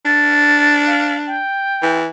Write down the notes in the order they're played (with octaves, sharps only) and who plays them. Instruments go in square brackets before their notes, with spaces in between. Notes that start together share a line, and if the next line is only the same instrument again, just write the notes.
[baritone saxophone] D4 [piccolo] A6
[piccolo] F5
G5
[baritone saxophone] E3